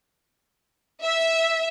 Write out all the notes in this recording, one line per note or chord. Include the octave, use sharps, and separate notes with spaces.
E5